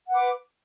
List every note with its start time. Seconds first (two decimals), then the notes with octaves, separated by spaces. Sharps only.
0.07 F#5
0.11 B4
0.15 D6